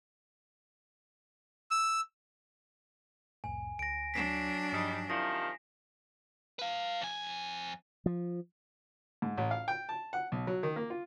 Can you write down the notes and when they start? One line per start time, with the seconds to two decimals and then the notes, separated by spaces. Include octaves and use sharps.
1.71 E6
3.44 C2 F2 A2 G#5
3.79 D2 A#6 D7
4.14 F#3 D4 B6 C7 E7
4.72 G2 F3 G3 D#4
5.10 C3 D#3 F3 E4 D5 A#6
6.59 B4 F5
7.01 F2 G#5
8.06 F3
9.22 G#2
9.37 A1
9.51 F5
9.68 G5
9.89 A5
10.13 F#5
10.32 B1
10.47 F#3
10.63 D#3
10.76 A#3
10.90 F4